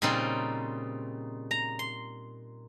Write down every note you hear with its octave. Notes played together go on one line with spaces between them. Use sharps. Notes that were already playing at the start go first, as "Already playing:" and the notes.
A#2 C#3 G3 C4 D#4
A#5
C6